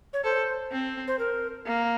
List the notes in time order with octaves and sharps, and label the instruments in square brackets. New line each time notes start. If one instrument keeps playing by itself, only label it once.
[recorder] C#5
[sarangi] A4 [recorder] C5
[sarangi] C4
[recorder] C5
A#4
[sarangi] A#3